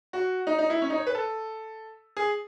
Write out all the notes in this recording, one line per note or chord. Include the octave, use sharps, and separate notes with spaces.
F#4
D#4
D#4
E4
C#4
D#4
C#5
B4
A4
G#4